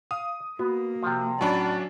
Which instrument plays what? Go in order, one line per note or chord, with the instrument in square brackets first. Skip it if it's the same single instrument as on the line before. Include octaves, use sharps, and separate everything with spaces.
[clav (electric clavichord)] F5 [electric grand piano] D#6
[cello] A#3 [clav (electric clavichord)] B3 [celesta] F#4
[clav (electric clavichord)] C3 F3
[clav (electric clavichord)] A2 [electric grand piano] F#3 C#4 D4 [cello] D5 [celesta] A5 B5